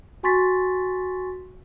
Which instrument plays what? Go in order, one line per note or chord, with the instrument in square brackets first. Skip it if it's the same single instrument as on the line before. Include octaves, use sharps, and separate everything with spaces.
[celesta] F#4 G#5 C6 C#6 A6 B6